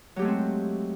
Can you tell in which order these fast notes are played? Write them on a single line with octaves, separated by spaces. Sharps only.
F#3 G4 A3 G#3 C4